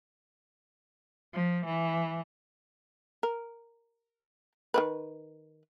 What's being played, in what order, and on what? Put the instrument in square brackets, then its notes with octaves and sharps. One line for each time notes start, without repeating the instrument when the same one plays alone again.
[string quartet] F3
E3
[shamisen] A#4
D#3 G3 B4